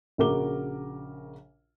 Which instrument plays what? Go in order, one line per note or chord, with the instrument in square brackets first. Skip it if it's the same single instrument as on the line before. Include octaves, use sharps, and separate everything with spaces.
[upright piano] A#1 C#3 F#4 A#4 D6 G7